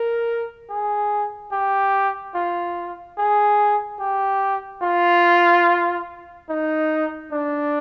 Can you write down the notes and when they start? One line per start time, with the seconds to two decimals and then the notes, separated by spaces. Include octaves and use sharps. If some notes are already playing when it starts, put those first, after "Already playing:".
Already playing: A#4
0.70 G#4
1.52 G4
2.35 F4
3.18 G#4
4.00 G4
4.83 F4
6.49 D#4
7.32 D4